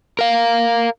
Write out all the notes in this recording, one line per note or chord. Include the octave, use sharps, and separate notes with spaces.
A#4 F5